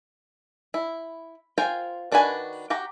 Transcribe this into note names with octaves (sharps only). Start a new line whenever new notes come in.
E4
F4 A#4 C5 G5 G#5
D#3 D4 F#4 B4 G#5
F#4 G4 G5 A#5